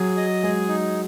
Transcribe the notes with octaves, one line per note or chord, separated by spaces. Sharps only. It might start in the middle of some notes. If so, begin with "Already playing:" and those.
Already playing: F#3 G#4
D#5
G#3 G#4
D#4